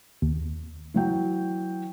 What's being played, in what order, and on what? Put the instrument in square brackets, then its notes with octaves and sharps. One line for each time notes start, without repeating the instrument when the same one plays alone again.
[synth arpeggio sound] D#2
[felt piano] E3 F#3 G5